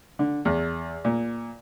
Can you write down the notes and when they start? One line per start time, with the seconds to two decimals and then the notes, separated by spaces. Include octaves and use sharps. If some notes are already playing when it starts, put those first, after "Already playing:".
0.19 D3
0.45 E2
1.05 A#2